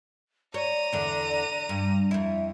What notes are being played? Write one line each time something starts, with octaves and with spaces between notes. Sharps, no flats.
C#5 D5 A#5 D#7
E2 D3
G2
F2 E4 E5